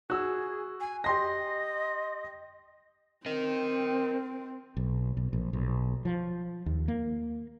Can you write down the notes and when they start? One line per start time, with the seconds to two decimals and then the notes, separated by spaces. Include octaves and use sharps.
0.10 F#4 G#4 E6
0.80 G#5
1.04 G4 D#5 C6 A#6
3.26 C4 A#4 D#5
4.77 B1
5.17 B1
5.33 A#1
5.53 B1
6.05 F3
6.66 D#2
6.88 A#3